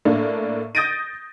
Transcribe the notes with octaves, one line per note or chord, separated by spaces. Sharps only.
A2 A#3 D4
D#6 G6 A6 A#6 D7 D#7